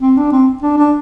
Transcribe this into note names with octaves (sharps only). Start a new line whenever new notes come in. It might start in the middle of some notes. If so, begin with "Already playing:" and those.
C4
D4
C4
D4
D4